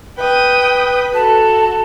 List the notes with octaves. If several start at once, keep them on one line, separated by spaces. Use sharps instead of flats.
B4 G5 D#6
F#4 A4 A5